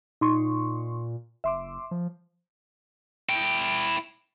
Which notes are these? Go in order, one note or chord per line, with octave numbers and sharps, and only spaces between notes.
A#2 D#4 C6 C#6
F#1 E5 C6 D6
F3
E4 G5